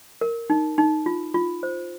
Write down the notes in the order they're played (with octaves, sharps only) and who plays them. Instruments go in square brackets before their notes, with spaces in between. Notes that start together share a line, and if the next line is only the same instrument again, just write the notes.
[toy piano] A#4
D#4
D#4
F4
F4
C5